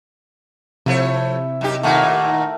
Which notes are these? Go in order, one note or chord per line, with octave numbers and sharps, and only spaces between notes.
C3 F3 A3 E4 C#5
F#2 D#4 G4
D#2 A#2 A3 D#4 A#4 F#5